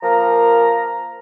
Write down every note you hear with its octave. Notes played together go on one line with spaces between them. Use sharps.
F3 A#3 A#4 A#5